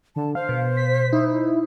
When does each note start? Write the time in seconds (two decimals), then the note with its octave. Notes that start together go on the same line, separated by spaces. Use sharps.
0.16 D3 A5
0.35 C5 F5
0.49 B2
0.77 B6
1.13 D#4 E4